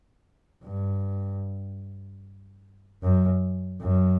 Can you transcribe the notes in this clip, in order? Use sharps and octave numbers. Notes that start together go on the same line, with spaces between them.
G2
F#2
F#2